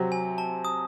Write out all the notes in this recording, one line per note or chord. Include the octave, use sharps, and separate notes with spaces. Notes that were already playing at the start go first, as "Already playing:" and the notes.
Already playing: C3 F#3 C4
G#5
A5
D#6